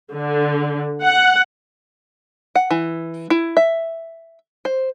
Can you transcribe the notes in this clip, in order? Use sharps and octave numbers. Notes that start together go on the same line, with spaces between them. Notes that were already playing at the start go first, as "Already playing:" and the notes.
D3
F#5
F#5
E3
E4
E5
C5